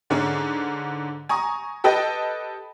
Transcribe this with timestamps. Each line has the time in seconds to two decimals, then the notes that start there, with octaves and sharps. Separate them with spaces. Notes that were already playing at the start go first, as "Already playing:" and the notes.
0.10 G#2 D3 C#4 G#4
1.29 G#5 A#5 C#6 D#6
1.84 G4 A4 B4 D#5 G5 A5